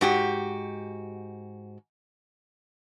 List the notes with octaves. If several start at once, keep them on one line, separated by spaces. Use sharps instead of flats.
G#2 F#4 G4